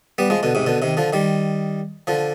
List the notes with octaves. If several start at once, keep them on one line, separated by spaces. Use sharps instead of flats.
G3 B3
F3 G#3
B2 D3
G#2 C3
B2 D3
C3 D#3
D3 F3
D#3 G3
D3 F3